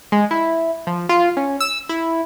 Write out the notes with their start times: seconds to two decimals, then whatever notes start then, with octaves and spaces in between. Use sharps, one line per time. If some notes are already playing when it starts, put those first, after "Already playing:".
0.12 G#3
0.31 E4
0.87 F3
1.09 F4
1.37 C#4
1.60 E6
1.89 E4